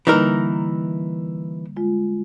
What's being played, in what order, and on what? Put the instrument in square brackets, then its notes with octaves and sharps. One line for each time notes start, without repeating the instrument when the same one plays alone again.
[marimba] D3 G3 A#3 [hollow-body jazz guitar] E3 D#4 A#4
[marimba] G#3 F4